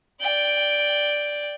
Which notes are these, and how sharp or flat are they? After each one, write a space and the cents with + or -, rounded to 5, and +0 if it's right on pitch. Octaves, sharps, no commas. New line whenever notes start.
D5 +0 G5 +0